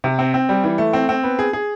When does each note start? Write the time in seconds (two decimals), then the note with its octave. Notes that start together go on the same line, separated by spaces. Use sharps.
0.04 C3
0.19 C4
0.34 C4
0.49 G3
0.64 E3
0.78 A3
0.93 C4
1.09 C4
1.23 B3
1.39 G#4
1.53 G#4